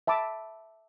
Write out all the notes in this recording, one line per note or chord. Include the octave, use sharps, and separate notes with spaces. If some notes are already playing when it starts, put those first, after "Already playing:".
E5 A5 B5 D6